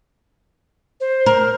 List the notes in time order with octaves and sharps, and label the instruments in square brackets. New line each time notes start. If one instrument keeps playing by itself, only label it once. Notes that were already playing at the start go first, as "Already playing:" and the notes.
[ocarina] C5
[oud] A#4